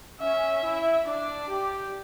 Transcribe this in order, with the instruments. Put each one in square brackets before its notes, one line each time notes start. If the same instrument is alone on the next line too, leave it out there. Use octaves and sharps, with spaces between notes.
[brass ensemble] C#4 [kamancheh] E5
[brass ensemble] E4
[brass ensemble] D4 [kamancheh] D5
[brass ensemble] G4